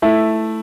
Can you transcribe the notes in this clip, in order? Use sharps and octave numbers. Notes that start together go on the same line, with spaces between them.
A3 E4